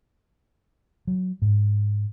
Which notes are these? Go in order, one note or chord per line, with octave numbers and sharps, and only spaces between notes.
F#3
G#2